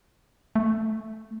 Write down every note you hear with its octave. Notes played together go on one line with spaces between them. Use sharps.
A3